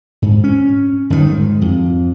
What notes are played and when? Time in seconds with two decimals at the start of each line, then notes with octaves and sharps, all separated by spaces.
0.22 G#2
0.44 C#4
1.10 G1 F2 B2 D#3
1.29 G#2
1.61 F2